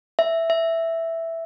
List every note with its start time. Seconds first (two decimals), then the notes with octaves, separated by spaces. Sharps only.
0.19 E5
0.50 E5